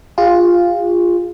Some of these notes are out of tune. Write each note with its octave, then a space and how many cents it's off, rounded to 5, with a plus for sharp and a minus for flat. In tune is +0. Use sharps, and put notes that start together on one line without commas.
F4 +0 G#4 -40